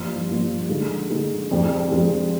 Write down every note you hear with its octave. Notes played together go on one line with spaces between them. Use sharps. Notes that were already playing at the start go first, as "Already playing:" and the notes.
Already playing: G2 F3 A#3 F4
G2 F3 A#3 F4
D3 G#3 D#4
D3 G#3 D#4
F2 C3 F3 G#3 D4
F2 C3 F3 G#3 D4